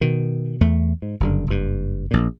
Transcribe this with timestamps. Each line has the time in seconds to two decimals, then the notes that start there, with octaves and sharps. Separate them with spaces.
0.01 B2 D#3
0.61 E2 A3
1.02 G#2
1.20 F#1 G2 D3
1.47 F#1 G2
2.11 A#1 A#2